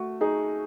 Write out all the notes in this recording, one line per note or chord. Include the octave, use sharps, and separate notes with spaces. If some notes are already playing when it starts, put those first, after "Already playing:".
Already playing: A3 F#4
D#4 G#4